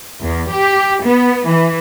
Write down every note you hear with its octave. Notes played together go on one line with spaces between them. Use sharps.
E2
G4
B3
E3